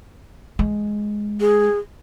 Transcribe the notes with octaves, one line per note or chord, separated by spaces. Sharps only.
G#3
G#4